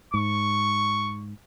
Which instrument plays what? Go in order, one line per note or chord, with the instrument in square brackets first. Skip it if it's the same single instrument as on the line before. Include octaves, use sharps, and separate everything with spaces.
[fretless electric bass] G#2 [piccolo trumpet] C#6